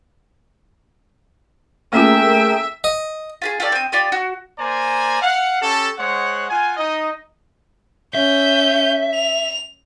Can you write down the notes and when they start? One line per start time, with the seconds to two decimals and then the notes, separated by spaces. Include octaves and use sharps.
1.93 A3 A#3 C#4 F4 G#4 A#4 E5 G5
2.84 D#5
3.42 F4 G4 G#4
3.60 F4 G4 A4 D5
3.72 C4 D#6
3.92 F4 G4 D5 D#6
4.12 F#4
4.58 A#3 C5 D5 G#5 A#5
5.21 F5 F#5
5.61 C#4 G4 A4
5.98 G#3 C5 C#5 F#5
6.49 F4 F#5 G#5
6.77 D#4 D#5
8.15 C#4 E5 G6
9.15 F7